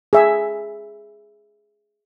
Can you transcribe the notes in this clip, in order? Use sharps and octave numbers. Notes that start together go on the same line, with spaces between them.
G#4 E5 G#5